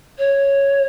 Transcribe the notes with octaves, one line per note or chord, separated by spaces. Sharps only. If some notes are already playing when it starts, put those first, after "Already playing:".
C#5